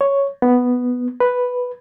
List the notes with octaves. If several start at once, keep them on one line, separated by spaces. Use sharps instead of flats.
C#5
B3
B4